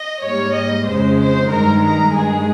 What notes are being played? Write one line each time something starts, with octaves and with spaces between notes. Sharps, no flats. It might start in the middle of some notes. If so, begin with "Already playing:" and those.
Already playing: D#5
G#2 G3 A#3 C#5
D#5
F2 C#3 G#3 C5
C5
G2 D#3 G#3 A#4
A#4
G2 D#3 G#3 G#4